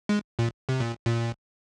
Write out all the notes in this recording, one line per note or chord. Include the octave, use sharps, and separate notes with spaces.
G#3
A#2
C3
A#2
A#2